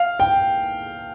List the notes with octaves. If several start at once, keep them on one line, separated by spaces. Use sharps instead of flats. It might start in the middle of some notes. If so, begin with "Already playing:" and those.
Already playing: F5
G5